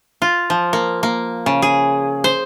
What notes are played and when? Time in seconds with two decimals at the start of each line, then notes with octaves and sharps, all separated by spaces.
0.22 F4
0.50 F3
0.73 A#3
1.03 A#3
1.46 C#3
1.62 G#4
2.24 C5